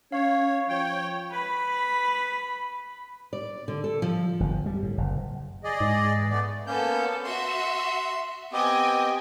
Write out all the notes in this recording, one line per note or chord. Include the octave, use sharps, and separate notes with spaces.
C#4 C#5 F5
F3 C#5 G5
B4 B5
D5
D3
A4
F3
G1
G3
A2
F#1
G#4 D5 D#5
G#2
E3
A3 B3 D5
A#3 B3 C#4 A4 G6
F#4 E5 C6
B3 C4 G4 D#5 G5 G#5